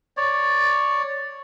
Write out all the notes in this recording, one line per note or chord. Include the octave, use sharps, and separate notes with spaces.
C#5 D5